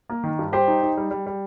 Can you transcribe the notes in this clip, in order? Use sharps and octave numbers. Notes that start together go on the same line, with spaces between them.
A#3
D#3
G2
G3 G4 C5
D#4
D#4
G3
G3
G3